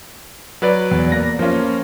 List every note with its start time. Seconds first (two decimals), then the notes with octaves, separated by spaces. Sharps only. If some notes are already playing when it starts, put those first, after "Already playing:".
0.62 F#3 B4 D5
0.91 E2
1.12 A#3 A#6
1.39 F3 A#3 C#4 F4